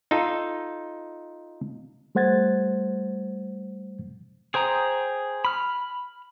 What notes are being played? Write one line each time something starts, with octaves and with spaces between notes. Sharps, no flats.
D#4 F4 A4
G3 A3 C5 F#5 G#6 A6
G#4 C5 G5 A#5 D#6
B5 F6